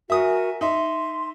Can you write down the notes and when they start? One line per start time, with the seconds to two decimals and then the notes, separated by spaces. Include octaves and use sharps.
0.10 F#4 A#4 E5 G#5 D#6
0.61 D#4 E5 C6